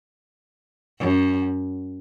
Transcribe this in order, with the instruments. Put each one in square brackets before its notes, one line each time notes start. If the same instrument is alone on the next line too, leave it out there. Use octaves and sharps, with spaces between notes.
[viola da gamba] F#2